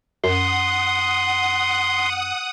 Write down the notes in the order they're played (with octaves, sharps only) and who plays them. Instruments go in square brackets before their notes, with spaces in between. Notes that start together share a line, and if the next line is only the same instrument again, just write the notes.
[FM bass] F#2 [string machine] F#5 D#6 [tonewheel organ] C6